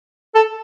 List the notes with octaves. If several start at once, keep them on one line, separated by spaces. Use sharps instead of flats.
A4